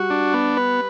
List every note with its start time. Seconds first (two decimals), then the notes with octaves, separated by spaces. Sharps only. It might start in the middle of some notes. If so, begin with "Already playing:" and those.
Already playing: G3 F#4
0.10 D4
0.33 B3
0.57 B4